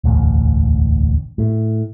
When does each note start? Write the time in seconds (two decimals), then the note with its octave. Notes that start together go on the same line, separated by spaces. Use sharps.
0.04 E1 A1 D2
1.38 A2